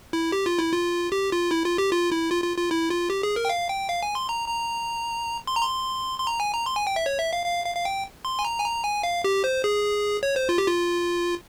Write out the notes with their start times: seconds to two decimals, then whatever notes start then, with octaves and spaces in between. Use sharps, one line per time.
0.13 E4
0.32 G4
0.46 F4
0.59 E4
0.72 F4
1.12 G4
1.32 F4
1.51 E4
1.65 F4
1.78 G4
1.91 F4
2.12 E4
2.30 F4
2.44 F4
2.57 F4
2.71 E4
2.90 F4
3.10 G4
3.23 G#4
3.36 A#4
3.45 G5
3.50 F5
3.70 G5
3.89 F5
4.03 G#5
4.15 C6
4.29 A#5
4.48 A#5
5.47 C6
5.56 A#5
5.63 C6
6.19 C6
6.27 A#5
6.40 G#5
6.53 A#5
6.66 C6
6.76 G#5
6.87 G5
6.96 E5
7.06 C#5
7.19 E5
7.33 F5
7.46 F5
7.66 F5
7.76 F5
7.85 G5
8.25 C6
8.39 G#5
8.45 A#5
8.60 G#5
8.64 A#5
8.84 G#5
9.03 F5
9.24 G4
9.44 C5
9.64 G#4
10.23 C#5
10.36 C5
10.49 F4
10.58 G4
10.67 F4